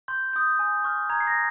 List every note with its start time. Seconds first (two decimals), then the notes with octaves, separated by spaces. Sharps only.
0.08 C6 G6
0.33 D#6 G6
0.59 G#5
0.84 C#6 F6
1.10 A#5 G#6
1.20 C7
1.27 A#6